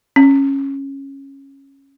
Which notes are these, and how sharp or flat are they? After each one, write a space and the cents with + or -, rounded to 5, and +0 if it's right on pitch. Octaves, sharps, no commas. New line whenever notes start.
C#4 -15